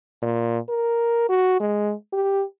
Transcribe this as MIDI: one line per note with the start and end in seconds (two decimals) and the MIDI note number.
0.22 0.58 46
0.69 1.25 70
1.29 1.56 66
1.60 1.93 56
2.13 2.44 67